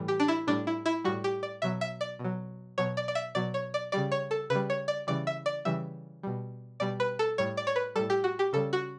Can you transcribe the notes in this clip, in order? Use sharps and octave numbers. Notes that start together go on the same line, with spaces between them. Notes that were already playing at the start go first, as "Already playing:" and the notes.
Already playing: A2 E3 G3
G4
D4
E4
A2 G3 D4
E4
E4
A2 G3 F#4
G4
D5
B2 F#3 E5
E5
D5
B2
F#3
B2 F#3 C#5
D5
D5
E5
B2 F#3 D5
C#5
D5
C#3 G3 D5
C#5
A4
C#3 B4
G3
C#5
D5
C#3 E3 G3 D5
E5
D5
C#3 E3 G3 E5
B2 G3
B2 G3 D5
B4
A4
A2 G3 C#5
D5
C#5
B4
A2 G3 A4
G4
F#4
G4
C#3 G3 A4
F#4